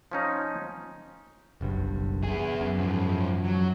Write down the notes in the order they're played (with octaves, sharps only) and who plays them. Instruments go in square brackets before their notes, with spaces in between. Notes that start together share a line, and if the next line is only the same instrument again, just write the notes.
[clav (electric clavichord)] F3 C#4 D#4
[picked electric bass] F#1 B1 G2
[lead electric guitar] B3 G#4
[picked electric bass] F#2
[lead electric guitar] G#2 F3
F#3